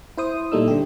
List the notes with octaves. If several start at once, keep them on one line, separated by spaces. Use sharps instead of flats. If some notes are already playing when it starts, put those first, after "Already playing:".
E4 C5 D#6
A#2 G3 A3 D#4 E6
D3 G4